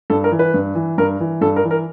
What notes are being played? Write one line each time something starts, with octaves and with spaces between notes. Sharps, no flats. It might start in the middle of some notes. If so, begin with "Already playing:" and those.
G2 A4
A#4
E3
B4
G2
E3
G2 A#4
E3
G2 A4
A#4
E3
A#4